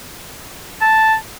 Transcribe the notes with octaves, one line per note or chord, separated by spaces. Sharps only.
A5